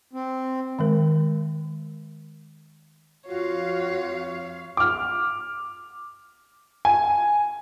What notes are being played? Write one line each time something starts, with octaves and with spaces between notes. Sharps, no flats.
C4
D#3 G#3 A#4
F2 F4 F#4 C#5 F5
D6 F6
G#5